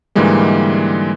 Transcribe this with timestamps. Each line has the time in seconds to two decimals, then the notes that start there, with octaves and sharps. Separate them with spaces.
0.15 G#2 D3 E3 G3 G#3 A#3